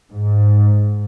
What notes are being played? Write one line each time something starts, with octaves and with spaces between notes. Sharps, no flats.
G#2